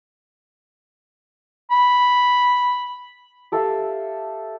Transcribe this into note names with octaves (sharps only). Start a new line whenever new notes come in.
B5
G4 A4 E5 F5